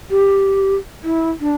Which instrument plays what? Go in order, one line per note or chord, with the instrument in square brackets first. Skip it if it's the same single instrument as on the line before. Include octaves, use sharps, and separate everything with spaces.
[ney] G4
E4
D4